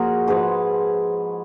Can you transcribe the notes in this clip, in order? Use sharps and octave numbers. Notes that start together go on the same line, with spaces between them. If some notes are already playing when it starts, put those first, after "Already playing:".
Already playing: A#2 F3 F#4 G#4 A#4
G#2 F3 G#4 B4